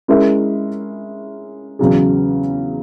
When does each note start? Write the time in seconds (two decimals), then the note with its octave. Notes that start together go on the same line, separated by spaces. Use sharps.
0.08 G#3 C#4 E4 A#4 E5
1.79 E2 C#3 F#3 C#4 G#4